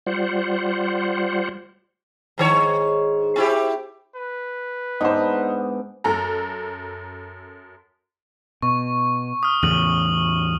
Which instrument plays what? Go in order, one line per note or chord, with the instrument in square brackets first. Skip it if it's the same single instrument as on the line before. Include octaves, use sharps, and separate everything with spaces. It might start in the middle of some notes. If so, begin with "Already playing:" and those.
[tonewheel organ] G3 F4 C5 F#5
[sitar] G#2 D#3 C#5
C4 E4 G4
[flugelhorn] B4
[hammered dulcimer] G#2 B3 D4 [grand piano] D#4 C5
[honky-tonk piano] F#2 A4 A#5
[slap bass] B2 [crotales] C#6
[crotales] D#6 F6
[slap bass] E2 A2 C#3 [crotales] D#7 F#7